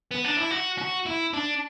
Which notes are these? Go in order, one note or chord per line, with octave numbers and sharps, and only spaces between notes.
B3
D4
E4
F#4
F#4
E4
D4